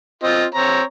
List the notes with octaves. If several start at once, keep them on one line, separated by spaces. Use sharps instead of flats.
C4 F4 D#5
C4 C#5 A#5